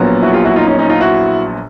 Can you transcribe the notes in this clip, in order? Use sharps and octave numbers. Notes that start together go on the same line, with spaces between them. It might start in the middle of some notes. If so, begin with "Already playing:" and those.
Already playing: A#1 A#2 F#3 B3
E4 F#4
F4 G4
E4 F#4
D#4 F4
C#4 D#4
C#4 D#4
D#4 F4
E4 F#4